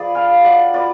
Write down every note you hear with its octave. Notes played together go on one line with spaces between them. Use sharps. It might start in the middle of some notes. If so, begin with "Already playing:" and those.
Already playing: F3 G#4 B4 D5
F4 F5 G#5
F#3 D5 F#5
F4 B4 D5